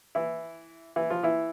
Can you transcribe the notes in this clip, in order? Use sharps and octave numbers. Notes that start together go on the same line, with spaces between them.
E3 E4
E3 E4
F3 F4
E3 E4